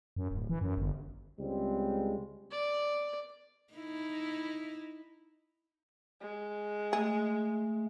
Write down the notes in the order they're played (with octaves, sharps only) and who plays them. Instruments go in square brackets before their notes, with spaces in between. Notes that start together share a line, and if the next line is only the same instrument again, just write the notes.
[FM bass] F#2
D1
E3
F#2
G1
[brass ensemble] C#2 G3 G#3 C4
[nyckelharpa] D5
[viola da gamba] D#4 E4
[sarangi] G#3
[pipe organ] A3 [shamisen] G#4